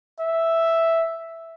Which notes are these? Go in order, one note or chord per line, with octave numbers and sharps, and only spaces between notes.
E5